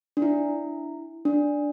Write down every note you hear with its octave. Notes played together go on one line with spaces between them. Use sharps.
D4
E4
D4